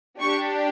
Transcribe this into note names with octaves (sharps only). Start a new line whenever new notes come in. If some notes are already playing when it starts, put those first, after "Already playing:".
D4 G4 C#6